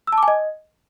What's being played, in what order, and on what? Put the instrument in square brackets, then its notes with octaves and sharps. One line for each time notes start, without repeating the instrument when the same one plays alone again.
[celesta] E6
A5
D6
G#5
D#5